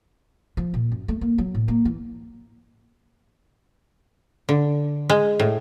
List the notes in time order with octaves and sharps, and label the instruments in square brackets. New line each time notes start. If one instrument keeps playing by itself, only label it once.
[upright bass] F3
A#2
F#2
A3
A#3
F#3
A2
A#3
E3
[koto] D3
G#3
A2